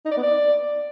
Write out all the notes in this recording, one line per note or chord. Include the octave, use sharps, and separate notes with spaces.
D#4
D5
B3
D5